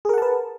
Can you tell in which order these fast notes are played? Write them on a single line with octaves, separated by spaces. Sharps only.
G#4 A#4 F#5 A5 B4